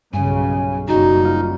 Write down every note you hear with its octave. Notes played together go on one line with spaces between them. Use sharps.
B1 G2 C#3 G#5
F#1 F#2 G3 D#4 F#4
F4